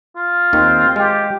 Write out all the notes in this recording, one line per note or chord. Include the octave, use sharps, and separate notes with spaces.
F4
D#2 D#3 C4
G#3 G4